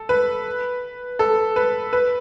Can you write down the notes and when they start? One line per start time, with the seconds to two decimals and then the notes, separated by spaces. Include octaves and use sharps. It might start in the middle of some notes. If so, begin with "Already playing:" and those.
Already playing: A4
0.09 B4
1.19 A4
1.56 B4
1.93 B4